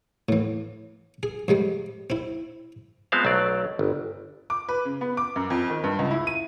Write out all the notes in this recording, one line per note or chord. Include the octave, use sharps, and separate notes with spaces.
A2 E3
G#4
F2 C3 G3 G#3
C4 E4
F3 G#3 B3 C4 C5 F5
B1 F#3 A3 D5
G1
D6
B4
C#3
B3
D6
F#2
F2
D#3
G2
C#2
E4
D#7